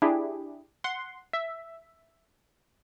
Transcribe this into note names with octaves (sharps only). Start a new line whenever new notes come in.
D4 E4 G4 G#4
F#5 C6
E5